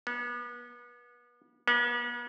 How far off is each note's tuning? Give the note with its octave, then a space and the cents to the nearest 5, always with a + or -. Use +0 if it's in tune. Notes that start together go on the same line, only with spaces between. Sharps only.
B3 -35
B3 -45